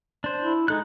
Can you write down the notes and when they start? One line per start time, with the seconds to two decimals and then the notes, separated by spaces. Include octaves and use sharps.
0.24 D4 C5
0.41 E4
0.68 G#3 D#4 A4 F#6